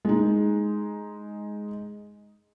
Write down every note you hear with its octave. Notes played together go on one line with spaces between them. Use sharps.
G#3 D#4